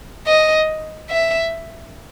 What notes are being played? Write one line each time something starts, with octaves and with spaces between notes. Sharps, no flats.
D#5
E5